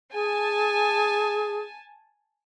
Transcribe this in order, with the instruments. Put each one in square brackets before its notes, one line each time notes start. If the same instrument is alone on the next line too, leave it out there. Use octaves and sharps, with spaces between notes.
[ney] G#4 [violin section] G#5 A5